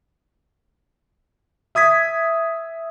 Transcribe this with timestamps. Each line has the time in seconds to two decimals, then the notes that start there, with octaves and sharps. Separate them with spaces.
1.75 E5 D#6 G#6 B6